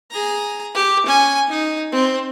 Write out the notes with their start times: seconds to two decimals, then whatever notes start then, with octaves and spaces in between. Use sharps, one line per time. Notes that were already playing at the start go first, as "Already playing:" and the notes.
0.11 G#4 A#5
0.74 G4
1.06 C#4 G#5
1.49 D#4
1.92 C4